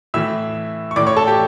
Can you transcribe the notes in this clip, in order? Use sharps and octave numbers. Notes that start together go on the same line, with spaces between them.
A2 E3 E5 E6
C#6
A2 E3 D5 D6
C#5 C#6
A4 A5
G4 G5